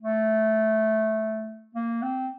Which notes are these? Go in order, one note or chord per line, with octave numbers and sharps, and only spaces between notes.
A3
A#3
C4